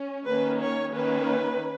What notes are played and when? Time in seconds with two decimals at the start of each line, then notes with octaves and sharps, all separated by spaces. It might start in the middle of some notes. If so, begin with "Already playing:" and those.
Already playing: C#4
0.26 D#3 A#3 C#4 B4
0.60 C#5
0.93 D#3 A#3 C#4 B4